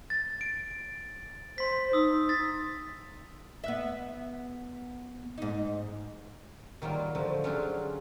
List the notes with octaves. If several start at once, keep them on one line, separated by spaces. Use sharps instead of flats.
A6
D7
C5 C6 B6
D#4 D#6 E6
A6 B6
B3 E5
G#2 D#4
D#3 F#3 G3 A#3 F4
D3 F3 A3 C5
F#3 C#4 D4 F4 G4 G#4